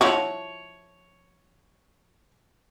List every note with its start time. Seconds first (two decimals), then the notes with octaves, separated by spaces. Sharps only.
0.01 F3 E4 F#4 C#5 C#6